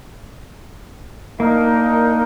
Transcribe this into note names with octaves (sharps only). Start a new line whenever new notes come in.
A#3 D4 D#4 A#4